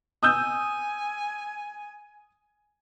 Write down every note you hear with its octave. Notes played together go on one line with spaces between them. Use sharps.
G#5 D#6 E6 G6